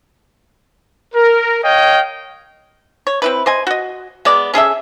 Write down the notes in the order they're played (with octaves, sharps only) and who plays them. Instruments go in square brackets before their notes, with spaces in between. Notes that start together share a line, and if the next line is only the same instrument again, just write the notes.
[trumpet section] A#4
C#5 D#5 F5 G5
[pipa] C#5
C4 E4 B4
C5 D#5 G#5
F#4 D#5
G#3 B3 D5
C#4 G#4 A4 E5